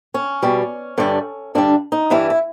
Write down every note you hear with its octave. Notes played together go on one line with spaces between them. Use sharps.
C#4
B2 G3
G2 D3 G3
G2 D3 G3 D4
D#4
G2 E3 G3 E4
E4